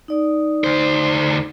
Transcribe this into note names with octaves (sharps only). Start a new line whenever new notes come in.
D#4 D5 D#6
D2 C5